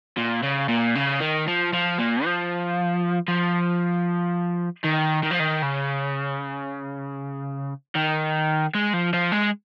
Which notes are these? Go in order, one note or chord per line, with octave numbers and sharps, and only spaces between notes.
A#2
C#3
A#2
C#3
D#3
F3
F3
A#2
F3
F3
D#3
D#3
F3
D#3
C#3
D#3
G#3
F3
F3
G#3